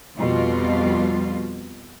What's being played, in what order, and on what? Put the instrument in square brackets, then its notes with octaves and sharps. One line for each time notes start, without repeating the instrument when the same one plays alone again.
[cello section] F2 B2 G3 F4